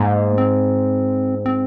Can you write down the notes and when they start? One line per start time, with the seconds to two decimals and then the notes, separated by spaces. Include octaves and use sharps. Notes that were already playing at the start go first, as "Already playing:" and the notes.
Already playing: G#2 A#3
0.38 C4
1.46 C4